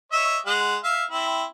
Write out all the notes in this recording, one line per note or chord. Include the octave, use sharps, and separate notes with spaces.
C#5 D#5 E5
G#3 F#5
E5 F5
C4 E4